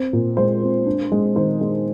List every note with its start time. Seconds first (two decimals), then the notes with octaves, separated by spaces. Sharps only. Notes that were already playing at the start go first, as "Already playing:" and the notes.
Already playing: C4
0.13 A#2
0.37 G#3 C5
0.62 C4
0.86 D4
1.12 G#3
1.36 D#3 C5
1.61 G#3